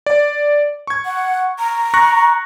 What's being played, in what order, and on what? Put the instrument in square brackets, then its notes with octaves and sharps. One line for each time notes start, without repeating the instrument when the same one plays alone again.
[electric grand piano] D5
C#6 G#6
[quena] F#5
A#5
[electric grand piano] C#6 F#6 A#6